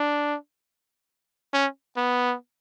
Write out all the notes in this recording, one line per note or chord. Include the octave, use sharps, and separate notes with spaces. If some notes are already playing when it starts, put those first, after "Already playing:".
Already playing: D4
C#4
B3